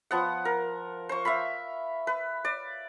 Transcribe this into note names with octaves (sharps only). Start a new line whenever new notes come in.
F3 B3 F#5
A#4
C5 C#6
E5 F5 B5
B4
D5